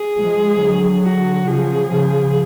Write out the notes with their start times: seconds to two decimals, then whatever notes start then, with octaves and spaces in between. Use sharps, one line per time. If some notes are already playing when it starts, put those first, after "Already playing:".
Already playing: G#4
0.18 F3 G#3
0.61 D3 F#3
1.04 F#4
1.47 C#3 F3 G#4
1.90 C#3 F3